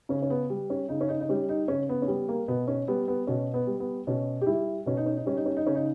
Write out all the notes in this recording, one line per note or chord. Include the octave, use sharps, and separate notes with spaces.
C#3 C#4
C#4
B3
G3
C#4
C#3 D#4
C#4
D#4
D#4
G3 C#4
D#4
C#3 C#4
B3
C#4
G3 B3
A#3
B2 B3
C#4
G3 B3
B3
B2 C#4
B3
G3
B3
B2 C#4
G4
G3 E4
B2 C#4
D#4
C#4
D#4
G3 C#4
D#4
C#4
D#4
C#3 C#4
D#4